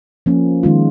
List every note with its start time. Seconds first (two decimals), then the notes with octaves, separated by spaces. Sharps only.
0.26 F3 A#3 C#4
0.63 D#3 G#3 C#4 F4